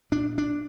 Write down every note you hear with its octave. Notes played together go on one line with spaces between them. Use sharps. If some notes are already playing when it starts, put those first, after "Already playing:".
A#2 D4
D4